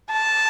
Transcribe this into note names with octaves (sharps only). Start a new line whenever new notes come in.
A5